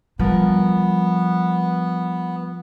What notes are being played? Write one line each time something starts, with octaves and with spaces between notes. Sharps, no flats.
F3 G3 B3 A#4